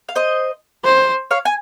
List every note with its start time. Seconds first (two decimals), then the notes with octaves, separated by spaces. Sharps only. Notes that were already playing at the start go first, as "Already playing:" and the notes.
0.09 F5
0.15 C5 D#5
0.84 C5
1.31 C#5 F5
1.45 G#5